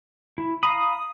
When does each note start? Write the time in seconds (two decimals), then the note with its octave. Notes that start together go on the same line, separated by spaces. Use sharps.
0.38 E4
0.63 F5 A#5 B5 D#6